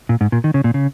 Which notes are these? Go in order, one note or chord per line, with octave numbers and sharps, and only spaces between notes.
A#2
G#2
A#2
D#3
C#3
A#2
C#3